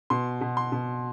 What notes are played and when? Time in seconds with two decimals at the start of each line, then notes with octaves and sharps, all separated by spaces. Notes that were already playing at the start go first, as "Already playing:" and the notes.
0.10 B2 C6
0.41 B2
0.57 C6
0.72 B2